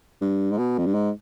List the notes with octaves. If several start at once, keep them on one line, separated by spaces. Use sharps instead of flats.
G2
G#2
B2
F2
G2
G#2